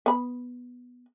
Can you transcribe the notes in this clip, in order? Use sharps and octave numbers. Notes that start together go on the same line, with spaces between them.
B3 B5